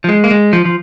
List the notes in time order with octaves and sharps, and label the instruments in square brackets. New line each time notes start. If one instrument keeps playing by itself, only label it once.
[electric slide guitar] F3
G#3
A#3
G#3
F3
F3